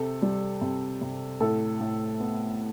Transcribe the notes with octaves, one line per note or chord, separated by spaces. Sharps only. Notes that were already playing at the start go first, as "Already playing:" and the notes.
Already playing: C3 A4
G3
C3
C3
A2 A4
A2
B3